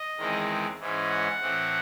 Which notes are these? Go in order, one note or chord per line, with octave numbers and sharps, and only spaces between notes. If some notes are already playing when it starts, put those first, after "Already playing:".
Already playing: D#5
E2 D#3 G#3 C4
G#2 E3 G#3 C#4
F#5
A2 E3 C4